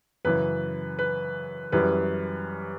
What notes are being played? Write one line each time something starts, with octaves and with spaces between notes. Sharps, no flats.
F#2 C#3 E3 B4
B4
F#2 E3 G3 B4